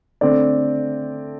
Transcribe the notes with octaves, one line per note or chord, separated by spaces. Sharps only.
D3 A3 C4 D5